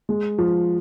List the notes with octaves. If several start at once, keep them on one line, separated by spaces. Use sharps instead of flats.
G#3
F3